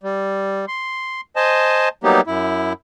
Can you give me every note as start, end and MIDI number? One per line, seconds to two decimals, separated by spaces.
0.03 0.65 55
0.68 1.21 84
1.36 1.89 72
1.36 1.89 75
1.36 1.89 80
1.36 1.89 81
2.04 2.21 54
2.04 2.21 55
2.04 2.21 58
2.04 2.21 59
2.04 2.21 63
2.04 2.21 67
2.27 2.73 42
2.27 2.73 64